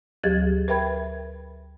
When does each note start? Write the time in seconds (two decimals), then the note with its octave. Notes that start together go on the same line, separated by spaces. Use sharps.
0.23 D2 F#3 G4 G#4 G#6 A6
0.68 A#4 B4 E5 G5 B5 G#6